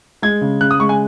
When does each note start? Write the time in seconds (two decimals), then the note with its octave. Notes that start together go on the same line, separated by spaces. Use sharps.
0.22 G#3 G#6
0.41 C#3
0.61 C#3 F#6
0.71 D#6
0.80 G#3 C#6
0.89 G#5